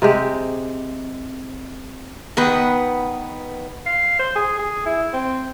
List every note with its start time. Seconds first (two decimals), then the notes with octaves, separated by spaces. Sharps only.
0.02 C3 G#3 G4
2.37 D#3 B3 B4
3.86 F5
4.19 C5
4.36 G#4
4.59 G#4
4.86 E4
5.13 C4